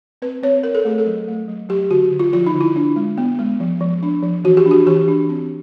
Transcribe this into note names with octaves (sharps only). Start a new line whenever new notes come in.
C4 B4
C4 C#5
C4 A#4
A4
A3 G#4
A4
F#3
A3
F#3
F#3 G4
D3 F#4
D3
F4
F3 F4
D#4
D3
E4
D4
G#3
B3
G#3
F3
F3
D4
F3
E3 F#4
G4
D4
F#4
E3 G4
D4
C4